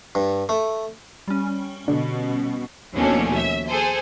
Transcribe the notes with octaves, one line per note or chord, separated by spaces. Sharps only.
G2
A3
G3 C#4
B2 D3
D#2 B2 F3 A3 C#4 D4
E5
G#4 A4 C5